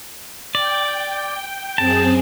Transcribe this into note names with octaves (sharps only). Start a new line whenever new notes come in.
D5 G5
F#2 C4 G#4 A5